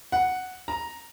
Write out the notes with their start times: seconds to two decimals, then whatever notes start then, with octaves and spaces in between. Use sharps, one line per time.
0.12 F#5
0.68 A#5